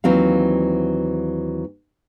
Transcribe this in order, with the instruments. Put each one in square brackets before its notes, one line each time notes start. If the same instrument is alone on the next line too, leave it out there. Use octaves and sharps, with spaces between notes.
[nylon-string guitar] D#2 E3 F#3 C4 F5